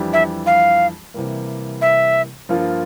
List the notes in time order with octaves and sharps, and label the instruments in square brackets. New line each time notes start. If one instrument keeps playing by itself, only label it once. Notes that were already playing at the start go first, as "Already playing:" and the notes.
Already playing: [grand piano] F2 E3 G3 D4 G4
[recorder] E5
F5
[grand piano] C3 E3 G3 A#3
[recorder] E5
[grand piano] G2 F3 A#3 F4